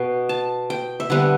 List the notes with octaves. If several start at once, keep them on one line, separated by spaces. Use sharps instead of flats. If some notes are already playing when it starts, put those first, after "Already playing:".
Already playing: B2
A5
G5
E5
D3 G3 B3 F#5